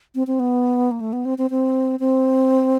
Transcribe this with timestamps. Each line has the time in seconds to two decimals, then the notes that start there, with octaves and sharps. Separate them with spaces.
0.15 C4
0.27 C4
0.40 B3
0.91 A#3
1.01 A3
1.13 B3
1.25 C4
1.38 C4
1.50 C4
2.00 C4